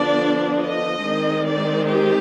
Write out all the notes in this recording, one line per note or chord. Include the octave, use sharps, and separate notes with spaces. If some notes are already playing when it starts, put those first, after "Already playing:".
Already playing: D3 F3 B3 D4 D5
D#5
D#3 G#3 C4
D5
G4